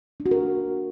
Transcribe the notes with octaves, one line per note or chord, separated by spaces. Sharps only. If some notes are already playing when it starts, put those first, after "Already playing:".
D4
F#4
A#4